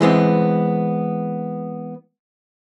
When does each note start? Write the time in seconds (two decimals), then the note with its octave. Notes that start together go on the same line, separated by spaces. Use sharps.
0.01 E3 G#3 B3 C4